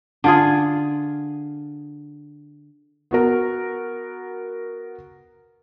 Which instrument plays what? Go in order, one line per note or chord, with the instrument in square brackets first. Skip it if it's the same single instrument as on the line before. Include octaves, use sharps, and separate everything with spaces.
[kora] D3 F4 G#4
[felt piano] B3 F#4 A#4